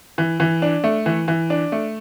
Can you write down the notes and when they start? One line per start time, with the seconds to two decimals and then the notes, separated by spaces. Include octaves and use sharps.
0.18 E3
0.40 E3
0.62 D4
0.84 A3
1.06 E3
1.28 E3
1.50 D4
1.72 A3